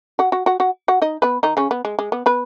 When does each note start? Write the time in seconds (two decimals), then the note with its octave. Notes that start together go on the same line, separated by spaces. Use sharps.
0.19 F#4 F#5
0.32 F#4 F#5
0.46 F#4 F#5
0.60 F#4 F#5
0.88 F#4 F#5
1.02 D#4 D#5
1.22 B3 B4
1.43 D#3 D#4
1.57 C#3 C#4
1.71 B3
1.85 G#3
1.99 G#3
2.12 B3
2.26 B3 B4